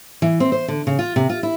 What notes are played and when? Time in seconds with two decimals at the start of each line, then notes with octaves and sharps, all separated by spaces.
0.22 E3
0.40 C4
0.52 C5
0.68 D3
0.87 C#3
0.99 F4
1.16 C3
1.29 F4
1.43 E4